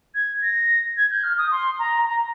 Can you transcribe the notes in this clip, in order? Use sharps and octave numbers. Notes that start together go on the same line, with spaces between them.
G#6
A#6
G#6
G6
F6
D#6
C6
A#5
A#5